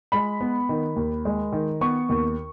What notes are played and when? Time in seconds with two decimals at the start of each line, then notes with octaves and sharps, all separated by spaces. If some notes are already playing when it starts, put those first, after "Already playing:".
0.12 G#3 B5
0.41 B3
0.69 D#3
0.96 D#2
1.25 G#3
1.52 D#3
1.81 B3 C#6
2.09 D#2